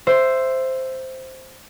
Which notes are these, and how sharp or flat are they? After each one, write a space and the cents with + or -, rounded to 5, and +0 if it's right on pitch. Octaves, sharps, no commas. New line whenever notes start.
C5 +0 E5 +10